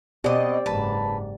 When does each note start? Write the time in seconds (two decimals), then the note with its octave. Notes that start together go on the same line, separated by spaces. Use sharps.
0.24 B2 C4 G4 D5 D#5
0.66 F#1 G#2 B4 A5